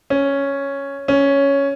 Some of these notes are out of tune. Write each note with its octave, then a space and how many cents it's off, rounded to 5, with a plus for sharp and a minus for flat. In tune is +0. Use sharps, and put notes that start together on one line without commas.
C#4 +0
C#4 +5